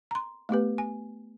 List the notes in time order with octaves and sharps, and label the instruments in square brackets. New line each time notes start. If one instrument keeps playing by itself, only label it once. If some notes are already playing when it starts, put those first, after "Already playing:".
[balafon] A#5 C6
A3 B3 G4 B4
G#5